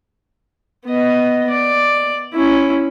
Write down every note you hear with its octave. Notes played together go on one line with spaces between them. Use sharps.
B3 D#5
D5
C#4 E4